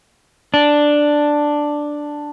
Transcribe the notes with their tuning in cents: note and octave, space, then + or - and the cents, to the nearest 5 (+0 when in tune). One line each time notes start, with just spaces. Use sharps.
D4 +5